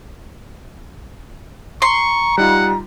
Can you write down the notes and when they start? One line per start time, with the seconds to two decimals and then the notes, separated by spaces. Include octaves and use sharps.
1.82 A#5 C6 C#6
2.38 G3 D#4 F4 F#5